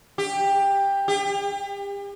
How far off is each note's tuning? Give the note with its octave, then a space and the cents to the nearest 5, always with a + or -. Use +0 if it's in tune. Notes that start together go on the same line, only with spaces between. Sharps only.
G4 +15
G4 +40